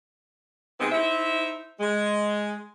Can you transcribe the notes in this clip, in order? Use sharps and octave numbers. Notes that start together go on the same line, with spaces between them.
C3 G#3 B3 C4 D#4
D#4 E4 C5 E5
G#3